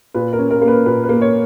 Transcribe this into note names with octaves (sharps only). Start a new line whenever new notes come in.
A#2 B4
A#4
C#4
A#4
A#3
B4
A#2 B4
B4
A#3
C#5